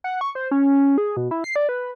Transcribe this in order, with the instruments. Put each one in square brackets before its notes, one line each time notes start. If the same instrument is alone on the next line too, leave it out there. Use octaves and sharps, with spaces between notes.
[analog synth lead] F#5
C#6
C5
C#4
G#4
B2
E4
C7
D5
B4